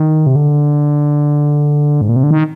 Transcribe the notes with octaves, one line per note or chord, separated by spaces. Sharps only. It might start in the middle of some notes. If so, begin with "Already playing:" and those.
Already playing: D#3
C3
D3
G#2
A#2
C3
D3
D#3